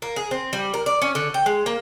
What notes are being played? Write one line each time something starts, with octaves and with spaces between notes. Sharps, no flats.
A#3
G#4
C4
G3
A#4
D5
C#4
D3
G5
G#3
A#3